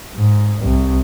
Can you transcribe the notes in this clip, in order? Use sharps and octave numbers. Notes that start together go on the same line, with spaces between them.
G#2
C2